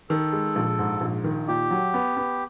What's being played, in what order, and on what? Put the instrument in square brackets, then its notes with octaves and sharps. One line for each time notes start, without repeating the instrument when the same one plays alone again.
[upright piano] D#3 [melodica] A4
[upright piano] G#3
A#1
G#2
A#1
D#3
[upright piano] A#2 [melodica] G4
[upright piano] F#3
B3
B3